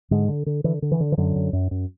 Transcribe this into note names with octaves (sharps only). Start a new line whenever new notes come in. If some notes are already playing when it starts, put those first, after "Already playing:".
G#2 D3 G#3
D3
D3
D3 E3
D3
E3
D3
E3
F#2 D3 F#3
F#2
F#2
F#2